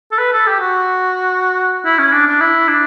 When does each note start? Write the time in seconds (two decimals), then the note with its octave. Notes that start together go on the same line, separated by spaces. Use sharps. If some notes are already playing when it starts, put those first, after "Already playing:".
0.12 A4
0.19 B4
0.33 A4
0.46 G4
0.60 F#4
1.85 E4
1.99 C#4
2.13 D4
2.27 D4
2.41 E4
2.68 D4